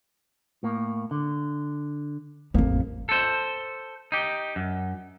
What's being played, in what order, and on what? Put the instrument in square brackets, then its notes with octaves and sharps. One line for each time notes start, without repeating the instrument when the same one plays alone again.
[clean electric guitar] A2 A#3
D3
[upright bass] A1 F2 [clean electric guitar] A#3
[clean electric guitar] A4 C5
D#4 G4
F#2